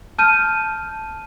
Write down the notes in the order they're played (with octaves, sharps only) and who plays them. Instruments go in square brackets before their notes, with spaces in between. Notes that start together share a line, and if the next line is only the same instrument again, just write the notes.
[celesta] A5 F6 G6 D#7